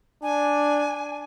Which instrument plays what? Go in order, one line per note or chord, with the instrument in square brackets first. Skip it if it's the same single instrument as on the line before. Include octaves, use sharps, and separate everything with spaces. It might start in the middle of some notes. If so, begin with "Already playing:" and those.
[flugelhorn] D4 [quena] G#5